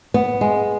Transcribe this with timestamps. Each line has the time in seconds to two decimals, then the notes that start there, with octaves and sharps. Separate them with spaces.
0.14 B3
0.41 G#3